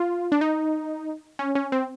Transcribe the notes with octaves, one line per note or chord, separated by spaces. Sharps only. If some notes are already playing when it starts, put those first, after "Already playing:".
Already playing: F4
D4
D#4
C#4
C#4
C4